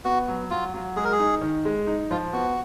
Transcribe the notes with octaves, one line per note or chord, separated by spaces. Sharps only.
B3 F#4
F#3
F#3 F4
F#3
G#3 G#4
A#4
G#4
D#4
D#3
G#3
D#4
F3 F4
B3 F#4